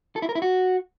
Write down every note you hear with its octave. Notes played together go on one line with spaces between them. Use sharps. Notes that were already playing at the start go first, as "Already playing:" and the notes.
A4
E4
A#4
E4
F#4